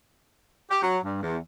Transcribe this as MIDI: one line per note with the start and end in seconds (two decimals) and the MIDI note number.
0.71 0.82 67
0.83 0.99 54
1.04 1.19 43
1.23 1.38 40